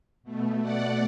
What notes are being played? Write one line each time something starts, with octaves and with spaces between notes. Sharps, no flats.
B2 A3
D5 F#5